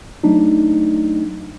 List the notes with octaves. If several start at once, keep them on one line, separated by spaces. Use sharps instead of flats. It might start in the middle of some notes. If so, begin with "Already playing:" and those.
F#3 A3 D4 D#4